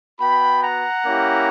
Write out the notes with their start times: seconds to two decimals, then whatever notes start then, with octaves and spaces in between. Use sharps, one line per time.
0.19 B3 F#4 G5 B5
0.62 F#5 A#5
1.05 A#3 C#4 E4 G4